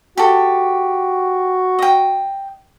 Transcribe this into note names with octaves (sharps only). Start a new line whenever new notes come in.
F#4 G4 A4
D#5 G5